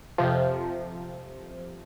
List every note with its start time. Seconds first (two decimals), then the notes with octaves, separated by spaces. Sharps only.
0.18 F2 C3 F3